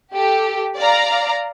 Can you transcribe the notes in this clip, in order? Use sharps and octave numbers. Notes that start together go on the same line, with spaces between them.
G4 A4
D5 F5 A#5